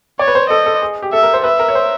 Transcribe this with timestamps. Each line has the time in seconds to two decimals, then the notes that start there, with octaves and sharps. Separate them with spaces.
0.19 C#5 D5
0.28 B4
0.35 C5
0.50 A4 D#5
0.66 A4
0.82 G#4
1.02 G4
1.13 A4 E5
1.23 A#4
1.34 C5
1.44 B4 E5
1.59 A#4
1.68 C#5
1.75 C5